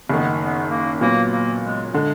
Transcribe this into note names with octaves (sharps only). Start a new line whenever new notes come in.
F#1 F#2 D#3 B3
B3
A#3
A#2 F#3 A#3 B3
A#3
G#3
D3 G#3